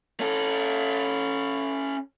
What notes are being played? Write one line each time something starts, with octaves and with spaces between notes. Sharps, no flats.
C#4 A4